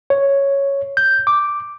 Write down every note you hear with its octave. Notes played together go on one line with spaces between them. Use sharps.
C#5
G6
D6